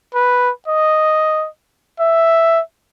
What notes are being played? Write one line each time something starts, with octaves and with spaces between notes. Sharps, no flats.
B4
D#5
E5